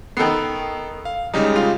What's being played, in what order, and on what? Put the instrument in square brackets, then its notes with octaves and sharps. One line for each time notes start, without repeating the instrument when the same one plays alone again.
[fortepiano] D#3 B3 [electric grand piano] A4 C7
[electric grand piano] F5
[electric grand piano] C#3 G3 G#3 [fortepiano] D#4
[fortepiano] F4